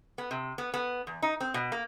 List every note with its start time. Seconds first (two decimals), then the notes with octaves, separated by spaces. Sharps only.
0.18 B3
0.31 C3
0.58 B3
0.74 B3
1.07 E2
1.22 D#4
1.40 C4
1.54 B2
1.72 A#3